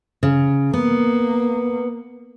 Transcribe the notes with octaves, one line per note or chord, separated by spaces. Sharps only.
C#3
A#3 B3